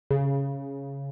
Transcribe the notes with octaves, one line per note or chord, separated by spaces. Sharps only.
C#3